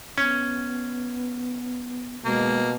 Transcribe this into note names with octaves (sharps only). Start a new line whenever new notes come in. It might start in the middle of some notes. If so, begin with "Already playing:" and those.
B3 C#4
B2 G#3 A#3